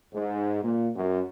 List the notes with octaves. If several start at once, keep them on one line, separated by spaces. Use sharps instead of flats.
G#2
A#2
F#2